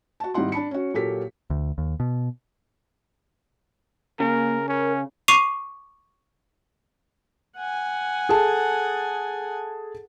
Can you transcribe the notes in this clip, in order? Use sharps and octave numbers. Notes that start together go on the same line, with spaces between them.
F#4 A5
G#1 G3 D#4 E4 F#5 C6
D4 A5 B5 C#7
C#4 F#4
A#2 F#3 A#3 G4 A4 B6
D2
D#2
B2
C#3 A#3 A#4
C#4 A#4
C#6 D6 C7 D#7 F7
F#5 G#5
G#4 A4 A5